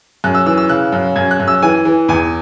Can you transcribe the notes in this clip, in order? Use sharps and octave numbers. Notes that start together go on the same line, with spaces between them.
F#2 F#6
E6
E3 E6
E6
C#3 F#6
F#2
F#2 G#6
F#6
F#2
E6
E3 G#5
E3
E2 G#5